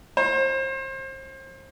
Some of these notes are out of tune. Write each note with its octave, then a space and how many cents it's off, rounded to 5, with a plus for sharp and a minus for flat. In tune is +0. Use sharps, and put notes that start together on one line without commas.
C5 +35